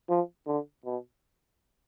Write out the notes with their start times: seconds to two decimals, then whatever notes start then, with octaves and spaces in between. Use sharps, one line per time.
0.10 F3
0.47 D3
0.85 B2